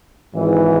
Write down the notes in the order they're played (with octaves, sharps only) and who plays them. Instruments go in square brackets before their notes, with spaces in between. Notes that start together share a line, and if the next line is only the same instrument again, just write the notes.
[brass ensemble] G#1 G#2 E3